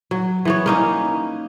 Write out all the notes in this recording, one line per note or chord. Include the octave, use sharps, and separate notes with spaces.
F#3
E3 B3 C#5
A#3 C#4 D#4